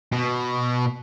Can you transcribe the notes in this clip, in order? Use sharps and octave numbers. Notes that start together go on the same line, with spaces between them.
B2